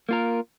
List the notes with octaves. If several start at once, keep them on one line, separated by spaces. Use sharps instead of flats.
A#3 F4 A#4